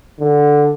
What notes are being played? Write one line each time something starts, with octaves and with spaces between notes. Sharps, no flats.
D3